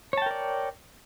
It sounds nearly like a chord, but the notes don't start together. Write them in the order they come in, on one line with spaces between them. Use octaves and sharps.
C#5 A5 G5 A#4 D5